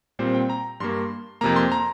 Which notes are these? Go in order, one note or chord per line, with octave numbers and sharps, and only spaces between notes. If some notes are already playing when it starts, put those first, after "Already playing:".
A#2 G3 C4 C5
G5
A#5
G2 G3 A#3 C6
F2 C3 A#3 A#5
C6
A#5